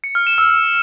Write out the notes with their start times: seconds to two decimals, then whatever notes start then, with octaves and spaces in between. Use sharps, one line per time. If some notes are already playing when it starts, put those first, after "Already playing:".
0.04 C#7
0.15 F6
0.27 E7
0.38 E6